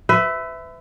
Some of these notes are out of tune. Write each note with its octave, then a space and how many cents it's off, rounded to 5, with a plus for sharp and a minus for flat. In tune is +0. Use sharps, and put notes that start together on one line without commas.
B4 +35 E5 +0